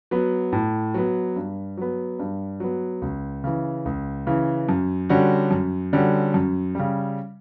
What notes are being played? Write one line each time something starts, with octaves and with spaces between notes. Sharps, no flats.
F#3 B3
A2
F#3 B3
G2
F#3 B3
G2
F#3 B3
C#2
C#3 E3
C#2
C#3 E3
F#2
D3 G3 C#4 F#4
F#2
D3 G3 C#4 F#4
F#2
C#3 G3